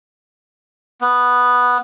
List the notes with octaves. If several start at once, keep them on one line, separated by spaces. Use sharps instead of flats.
B3